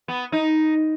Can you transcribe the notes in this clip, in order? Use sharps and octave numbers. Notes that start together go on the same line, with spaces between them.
B3
D#4